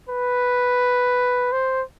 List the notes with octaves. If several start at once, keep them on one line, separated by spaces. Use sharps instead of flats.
B4
C5